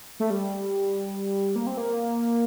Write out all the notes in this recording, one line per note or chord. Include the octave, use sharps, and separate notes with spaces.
A3
G3
A#3
C4
A#3